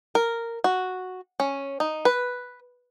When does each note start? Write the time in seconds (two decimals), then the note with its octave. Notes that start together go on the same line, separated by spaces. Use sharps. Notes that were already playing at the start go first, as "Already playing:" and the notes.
0.15 A#4
0.64 F#4
1.40 C#4
1.80 D#4
2.05 B4